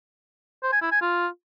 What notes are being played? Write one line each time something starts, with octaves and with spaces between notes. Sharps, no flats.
C5
G#5
E4
G#5
F4